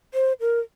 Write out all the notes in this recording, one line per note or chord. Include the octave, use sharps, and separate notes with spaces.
C5
A#4